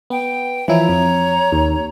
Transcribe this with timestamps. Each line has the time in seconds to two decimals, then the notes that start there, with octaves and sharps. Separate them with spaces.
0.10 B3 G5
0.68 E3 F3 E4 C#5 A#5
0.89 F2
1.52 D#2